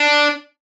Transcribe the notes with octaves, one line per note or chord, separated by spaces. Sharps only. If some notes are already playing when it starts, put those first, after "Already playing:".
Already playing: D4